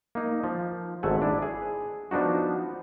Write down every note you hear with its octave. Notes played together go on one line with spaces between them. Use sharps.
A#3 D#4
F3
G#1 G#2 A3 E5 F#5 G#5
D4 E4
G#4
F3 B3 D4 D#4 F#4